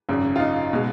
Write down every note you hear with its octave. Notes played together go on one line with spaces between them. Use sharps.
G#1 F#2 C#3
F4
D#4
B2 G#3